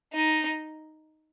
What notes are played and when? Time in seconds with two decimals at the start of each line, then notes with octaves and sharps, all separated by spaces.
0.14 D#4